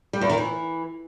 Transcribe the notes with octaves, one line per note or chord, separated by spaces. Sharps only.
G3
E2
D#3
E3